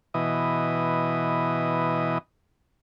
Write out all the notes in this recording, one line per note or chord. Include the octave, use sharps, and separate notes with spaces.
B2 E3 D#5